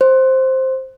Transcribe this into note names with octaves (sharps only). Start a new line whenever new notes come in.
C5